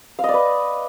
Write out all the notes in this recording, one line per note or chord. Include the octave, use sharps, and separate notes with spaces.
B4 D5 D#5 F5